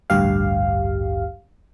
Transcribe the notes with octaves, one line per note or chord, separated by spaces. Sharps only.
A1 D2 G2 G4 F5